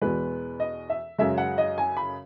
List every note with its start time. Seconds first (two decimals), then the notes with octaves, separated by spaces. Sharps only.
0.02 E2 B2 G#3 B4
0.60 D#5
0.90 E5
1.18 F#2 C#3 G#3 E5
1.38 F#5
1.58 D#5
1.78 G#5
1.97 B5